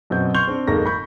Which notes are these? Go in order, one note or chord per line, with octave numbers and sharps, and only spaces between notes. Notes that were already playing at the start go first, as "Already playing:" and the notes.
F#2 B2 C4 G6
C6 C#6 F6 G6 F7 G7
C4 D4
D1 G#2 A#3 A4 C#6 A#6
B5 C#6 G6